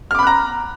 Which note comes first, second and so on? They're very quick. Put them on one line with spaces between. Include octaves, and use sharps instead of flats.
F6 D6 B5 F#6 A#5